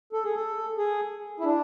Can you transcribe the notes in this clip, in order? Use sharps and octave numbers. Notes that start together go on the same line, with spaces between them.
A4
G#4
A4
G#4
E4
D4